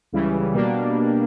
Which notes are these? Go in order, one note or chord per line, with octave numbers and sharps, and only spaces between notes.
C#2 C#3 E3 G3
B2 G3 A#3 D4